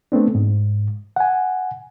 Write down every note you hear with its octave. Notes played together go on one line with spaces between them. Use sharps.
A3 B3 C4 D4
G#2
F#5 G#5